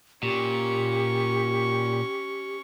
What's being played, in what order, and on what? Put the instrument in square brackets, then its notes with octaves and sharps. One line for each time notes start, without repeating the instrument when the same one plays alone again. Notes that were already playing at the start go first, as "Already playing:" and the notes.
[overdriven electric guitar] A#2 [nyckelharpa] C#4 C#6 [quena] G4